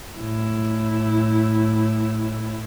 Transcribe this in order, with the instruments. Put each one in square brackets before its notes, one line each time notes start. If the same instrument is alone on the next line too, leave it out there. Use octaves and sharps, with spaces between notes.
[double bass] A2 E4